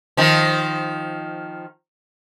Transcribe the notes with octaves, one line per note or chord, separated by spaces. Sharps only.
D#3 F3